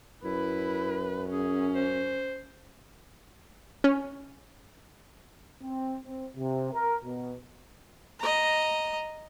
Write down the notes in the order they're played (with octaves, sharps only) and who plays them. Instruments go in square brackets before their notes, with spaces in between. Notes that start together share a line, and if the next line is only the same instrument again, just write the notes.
[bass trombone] F#2 [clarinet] E4 [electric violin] B4
[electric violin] C#4 [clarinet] G#4
[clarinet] C5
[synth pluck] C#4
[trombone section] C4
C4
C3
A#4
B2
[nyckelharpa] D#5 A#5